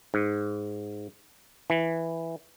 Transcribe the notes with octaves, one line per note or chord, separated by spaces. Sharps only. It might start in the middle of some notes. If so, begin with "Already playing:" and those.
G#2
E3